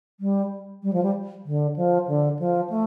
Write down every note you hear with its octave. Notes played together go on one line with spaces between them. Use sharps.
G3
G3
F3
G3
D3
F3
D3
F3
A3